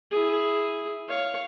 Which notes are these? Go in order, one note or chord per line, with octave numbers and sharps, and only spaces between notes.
E4 G#4
C#5 F5